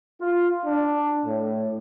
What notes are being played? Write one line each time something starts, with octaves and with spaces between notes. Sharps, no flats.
F4
D4
A2